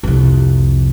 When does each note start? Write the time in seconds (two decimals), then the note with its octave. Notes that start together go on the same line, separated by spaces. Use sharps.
0.03 C2 F2